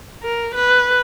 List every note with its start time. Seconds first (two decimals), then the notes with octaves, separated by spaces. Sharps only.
0.23 A#4
0.54 B4